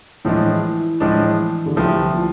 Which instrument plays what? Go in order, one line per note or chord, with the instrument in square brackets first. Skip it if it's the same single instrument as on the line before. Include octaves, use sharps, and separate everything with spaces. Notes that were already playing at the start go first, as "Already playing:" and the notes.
[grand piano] A2 F3 G#3 D4 [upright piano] E3
[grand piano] A2 F3 G#3 D4
[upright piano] D3
[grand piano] C2 C3 F3 A3 [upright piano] E3
[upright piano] F3